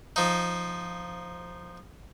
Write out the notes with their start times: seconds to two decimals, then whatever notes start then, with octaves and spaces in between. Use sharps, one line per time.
0.16 F3 D#4